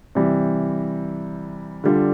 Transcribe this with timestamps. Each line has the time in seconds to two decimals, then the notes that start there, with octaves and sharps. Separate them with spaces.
0.15 C3 E3 G3
1.84 D3 G3 D4 F4